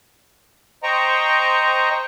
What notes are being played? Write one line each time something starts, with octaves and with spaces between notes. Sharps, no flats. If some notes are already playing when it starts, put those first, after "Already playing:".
C5 D#5 G5 A#5 C#6